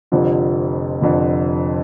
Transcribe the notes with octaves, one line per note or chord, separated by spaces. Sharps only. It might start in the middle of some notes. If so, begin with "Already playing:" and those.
F1 F2 D3 F3
F1 F2 D3 F3